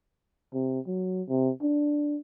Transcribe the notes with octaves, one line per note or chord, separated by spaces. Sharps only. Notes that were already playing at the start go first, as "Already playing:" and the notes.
C3
F#3
C3
D4